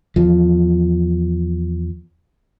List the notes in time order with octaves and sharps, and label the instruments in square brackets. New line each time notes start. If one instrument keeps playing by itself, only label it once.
[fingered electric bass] E2 F3